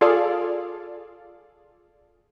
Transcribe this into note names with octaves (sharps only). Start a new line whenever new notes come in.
F4 G#4 A4 D5 F5